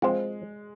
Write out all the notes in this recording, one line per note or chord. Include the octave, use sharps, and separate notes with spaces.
F3 G#3 C4 F4 C5 F5